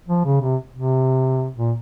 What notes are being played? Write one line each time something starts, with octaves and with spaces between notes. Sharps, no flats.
F3
C#3
C3
C3
A#2